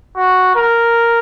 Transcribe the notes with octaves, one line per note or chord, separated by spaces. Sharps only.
F#4
A#4